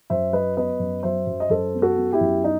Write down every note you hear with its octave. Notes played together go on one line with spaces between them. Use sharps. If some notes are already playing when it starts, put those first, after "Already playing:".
F#2 C5 E5
F#3 B4 D#5
B3 B4 D#5
F#2
F#3 C5 E5
F#2
D#5
F#2 A4 C5
B3
F#4 A4
B3
E4 G4
F#2
D#4